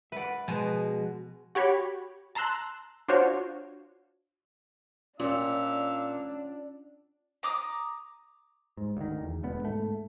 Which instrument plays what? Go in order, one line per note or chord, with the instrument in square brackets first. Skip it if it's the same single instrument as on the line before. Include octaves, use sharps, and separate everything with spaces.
[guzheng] B4 D5 [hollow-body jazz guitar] E5 F#5
[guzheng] B2 G#3 [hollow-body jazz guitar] F3
[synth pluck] F#4 G4 C#5 B5
A5 A#5 C6 E6 F#6
D4 F4 F#4 C5 C#5
[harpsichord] A#2 [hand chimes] C#4 F4 C#5 [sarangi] D4 [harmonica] F5 E6
[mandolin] A#5 D6 D#6
[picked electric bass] G#2
D2 D#3
E2
E1 D2 B3
G#2 A3